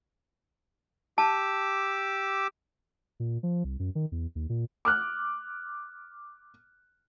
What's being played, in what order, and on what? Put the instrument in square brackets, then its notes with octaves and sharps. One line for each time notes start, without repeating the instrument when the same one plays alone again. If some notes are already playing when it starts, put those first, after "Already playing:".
[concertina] G4 D6 E6 [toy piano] A5
[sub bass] A#2
F3
C2
F#2
D#3
E2
D#2
A#2
[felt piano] D6 F6 F#6